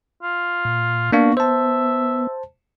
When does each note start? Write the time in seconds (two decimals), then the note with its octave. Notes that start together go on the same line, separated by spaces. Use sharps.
0.23 F4
0.65 A#2
1.12 A#3 B3 D4 F#4 F5
1.37 C5 E5 A5